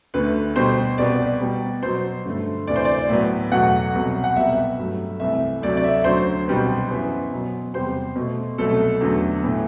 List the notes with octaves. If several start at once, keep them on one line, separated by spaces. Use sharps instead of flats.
D2 D3 A3 B4
B2 G3 B3 C5
C2 B2 G3 B3 D5
B2 G3 B3
B2 F#3 B3 C5
G2 D3 A3
D2 C3 E3 D5
C5
D5
A2 F#3 B3
E2 B2 F#3 A3 F#5
C2 B2 F#3
F#5
C2 B2 G3 B3 E5
G2 F#3 A3
C2 C3 E3 A3 E5
D2 C3 F#3 A3 D5
D5
E5
D2 D3 F#3 C5
C2 B2 G3 B3
F#2 E3 B3
B2 F#3 B3
E2 C3 G3 B3 C5
B2 A3
C2 B2 F#3 A3 A4
E2 D3 F#3 A3
A2 E3 B3